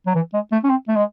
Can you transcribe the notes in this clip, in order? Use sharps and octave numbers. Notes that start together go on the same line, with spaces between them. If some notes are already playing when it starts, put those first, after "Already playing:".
F#3
E3
G#3
A3
C#4
C4
A3
G#3